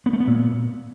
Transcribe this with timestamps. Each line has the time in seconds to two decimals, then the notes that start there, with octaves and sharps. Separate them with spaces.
0.06 B3
0.13 A3
0.20 B3
0.27 A#2